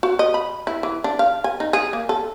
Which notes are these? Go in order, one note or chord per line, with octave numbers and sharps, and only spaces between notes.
F#4
D#5
B5
E4
E3
D4
F5
G#5
D#4
G#4
A#3
A4